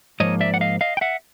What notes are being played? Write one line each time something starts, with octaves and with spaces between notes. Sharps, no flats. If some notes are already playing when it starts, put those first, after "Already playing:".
G#2 F3 A#3 C#5 D#5
D5 E5
F#5
D#5 F5
D#5 F5
G5
E5 F#5